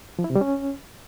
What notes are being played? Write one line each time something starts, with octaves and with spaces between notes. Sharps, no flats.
F3
E4
C3
G3
C#4